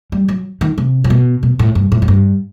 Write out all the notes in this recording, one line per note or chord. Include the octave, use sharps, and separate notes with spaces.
G3
F#3
D#3
C3
A2
B2
B2
A2
G2
A2
A2
G2